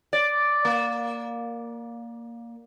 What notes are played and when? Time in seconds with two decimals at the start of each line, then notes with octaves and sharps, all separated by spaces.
0.13 D5
0.65 A#3